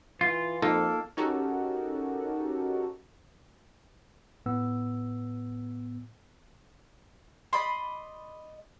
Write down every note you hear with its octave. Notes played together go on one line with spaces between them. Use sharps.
E3 F4
F2 A#3 D#4 F4 A4
C#4 D#4 F#4 G4 A4 A#4
A2 B3 E6
D5 D#5 B5 C6